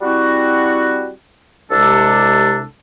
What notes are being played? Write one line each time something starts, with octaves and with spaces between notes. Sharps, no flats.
G3 C4 E4 F#4
C2 C3 G#3 D4 A4